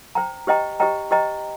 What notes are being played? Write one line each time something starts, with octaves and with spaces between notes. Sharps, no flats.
C5 G5 A#5
G4 C5 D#5 G5 A#5
G4 C5 D#5 G5 A#5
G4 C5 D#5 G5 A#5